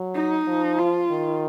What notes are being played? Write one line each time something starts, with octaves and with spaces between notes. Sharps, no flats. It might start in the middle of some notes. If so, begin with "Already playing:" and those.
Already playing: F#3
D#4
F3
F4
D#3